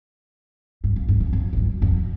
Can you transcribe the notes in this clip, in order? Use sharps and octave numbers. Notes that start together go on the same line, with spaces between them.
G2
F2
G2
F2
F2
G#2
G2
F2